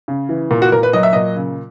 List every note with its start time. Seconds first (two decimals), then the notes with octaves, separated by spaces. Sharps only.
0.08 C#3
0.29 E3
0.51 A#2
0.62 F#4
0.72 A#2 A#4
0.83 B4
0.93 F#3 D#5
1.03 E5
1.13 A#2 D#5
1.36 C#3